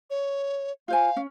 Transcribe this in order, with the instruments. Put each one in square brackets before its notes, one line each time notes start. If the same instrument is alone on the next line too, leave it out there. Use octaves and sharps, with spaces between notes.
[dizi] C#5
[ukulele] F4 C5 G#5 [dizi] F5
[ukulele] C#4